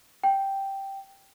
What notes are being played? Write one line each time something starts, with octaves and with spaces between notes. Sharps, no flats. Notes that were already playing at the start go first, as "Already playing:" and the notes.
G5